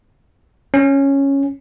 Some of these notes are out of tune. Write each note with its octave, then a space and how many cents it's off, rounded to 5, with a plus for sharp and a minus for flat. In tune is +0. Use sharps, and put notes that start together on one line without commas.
C#4 -5